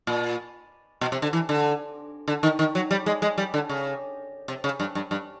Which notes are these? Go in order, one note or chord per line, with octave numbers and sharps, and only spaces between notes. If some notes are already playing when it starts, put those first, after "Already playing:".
A#2
B2
C3
D3
E3
D3
D3
D#3
D#3
F#3
G3
G#3
G#3
G3
D3
C#3
C3
C#3
G2
G2
G2